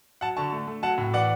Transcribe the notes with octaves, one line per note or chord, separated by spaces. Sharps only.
F#3 F#5 A5
D3 A5 C#6
A3
A3
F#3 F#5 A5
A2
E3 D5 F#5